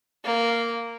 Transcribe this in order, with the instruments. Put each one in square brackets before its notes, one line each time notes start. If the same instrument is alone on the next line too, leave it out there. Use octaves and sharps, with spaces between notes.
[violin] A#3